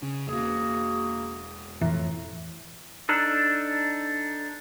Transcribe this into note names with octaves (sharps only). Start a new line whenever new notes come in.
C#3
E1 A#3 F#4 G#4
F2 A2 E3
D4 D#4 A4